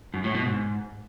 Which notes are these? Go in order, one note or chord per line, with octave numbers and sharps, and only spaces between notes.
F#2
A2
B2
G#2